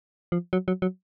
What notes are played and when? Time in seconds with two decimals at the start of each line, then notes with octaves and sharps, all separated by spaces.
0.32 F3
0.53 F#3
0.68 F#3
0.82 F#3